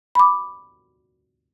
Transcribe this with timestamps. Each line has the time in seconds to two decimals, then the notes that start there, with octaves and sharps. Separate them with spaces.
0.15 B5 D6